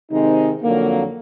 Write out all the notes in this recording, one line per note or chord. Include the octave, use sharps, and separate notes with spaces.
C3 D#3 G#3 C4 D#4
F2 D3 F#3 A#3